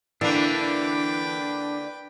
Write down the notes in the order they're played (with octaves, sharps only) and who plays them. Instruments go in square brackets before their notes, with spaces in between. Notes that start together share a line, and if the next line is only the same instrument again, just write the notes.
[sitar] D3 A#3 [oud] E3 [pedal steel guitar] D4 [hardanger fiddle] B4 G5